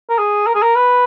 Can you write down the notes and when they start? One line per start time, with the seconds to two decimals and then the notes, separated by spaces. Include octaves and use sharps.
0.09 A#4
0.18 G#4
0.47 A#4
0.55 G#4
0.62 A#4
0.76 B4